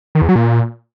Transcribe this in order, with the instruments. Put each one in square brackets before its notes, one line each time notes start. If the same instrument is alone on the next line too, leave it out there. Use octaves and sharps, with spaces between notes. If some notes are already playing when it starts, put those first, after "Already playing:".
[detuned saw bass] D#3
E2
F#3
A#2